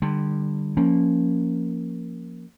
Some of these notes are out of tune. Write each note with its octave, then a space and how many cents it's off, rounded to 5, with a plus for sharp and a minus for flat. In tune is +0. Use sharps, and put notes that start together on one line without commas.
D3 +25 G3 +0
F3 +0 A#3 +0 C#4 +0